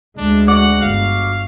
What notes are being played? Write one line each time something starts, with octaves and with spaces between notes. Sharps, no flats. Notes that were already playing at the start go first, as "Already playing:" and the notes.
D2 G#3 D4
F#4 D5 F#5
G1 F5